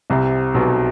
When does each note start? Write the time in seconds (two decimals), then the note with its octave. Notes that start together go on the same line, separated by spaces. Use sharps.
0.10 C2 C3
0.54 B1 B2